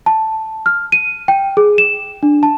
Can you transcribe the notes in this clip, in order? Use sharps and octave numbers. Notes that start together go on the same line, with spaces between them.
A5
F6
D#7
G5
G#4
E7
D4
A5